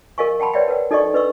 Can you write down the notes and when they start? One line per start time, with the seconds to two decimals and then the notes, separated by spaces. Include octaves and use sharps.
0.18 A#4 D#5 F5 G#5 C#6
0.40 F#5 G5 A5 B5 C6
0.54 B4 C#5 D5 E5 F#5 G5
0.68 A#4 B4 F#5 G5
0.91 D#4 A4 D5 D#5 G5 C#6
1.14 D4 B4 D#5 C#6 E6